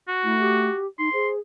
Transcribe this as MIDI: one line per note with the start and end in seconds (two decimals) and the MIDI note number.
0.08 0.81 66
0.24 0.69 57
0.24 0.38 64
0.39 0.86 67
0.99 1.09 63
0.99 1.28 84
1.13 1.38 68
1.13 1.35 72